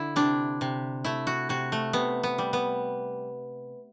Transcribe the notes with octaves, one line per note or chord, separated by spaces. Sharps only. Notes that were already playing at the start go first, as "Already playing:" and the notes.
Already playing: D3 E4
C3 D4
C3
A3 E4
F#4
C3 F#4
A3
C3 B3
B3
G3
B3